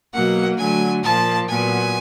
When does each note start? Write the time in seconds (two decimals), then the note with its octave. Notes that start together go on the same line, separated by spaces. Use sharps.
0.12 B2 F#3 A#3 F#5
0.57 D3 F#3 A3 G#5
1.03 A#2 F3 A#3 A5
1.48 A#2 F#3 B3 G#5